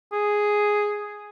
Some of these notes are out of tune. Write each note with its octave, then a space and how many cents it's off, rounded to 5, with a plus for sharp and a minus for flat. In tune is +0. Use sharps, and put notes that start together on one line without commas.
G#4 +0